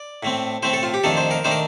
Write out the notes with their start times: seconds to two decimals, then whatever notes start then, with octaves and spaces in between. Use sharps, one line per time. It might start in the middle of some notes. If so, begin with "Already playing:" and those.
Already playing: D5
0.23 A2 A3 C4
0.63 A2 A3 C4 C5
0.73 A4
0.83 F4
0.94 G4
1.04 F2 D#3 A3 D4 A4
1.17 C5
1.31 A#4
1.44 D#3 A3 D4 C5
1.51 A#4